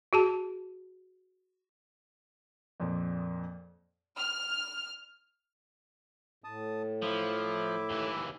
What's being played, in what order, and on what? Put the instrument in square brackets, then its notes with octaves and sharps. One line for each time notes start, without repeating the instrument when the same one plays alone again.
[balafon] F#4 G#4 A5
[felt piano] F2 A#2 F3
[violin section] F6
[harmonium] A2 [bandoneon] A5 D#6
[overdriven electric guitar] F3 [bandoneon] E4 E5 D6
[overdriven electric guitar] D#2 E3